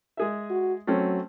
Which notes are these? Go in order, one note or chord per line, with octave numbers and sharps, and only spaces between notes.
G#3 G#4 E5
F#4
F#3 A3 C4 C#4